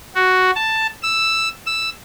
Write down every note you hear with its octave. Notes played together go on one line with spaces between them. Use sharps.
F#4
A5
E6
E6